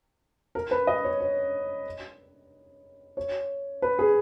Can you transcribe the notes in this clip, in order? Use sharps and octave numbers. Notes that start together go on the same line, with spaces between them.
A#4
B4
D#5
C#5
C#5
C#5
B4
G#4